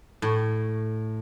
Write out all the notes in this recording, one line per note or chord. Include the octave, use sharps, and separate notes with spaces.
A2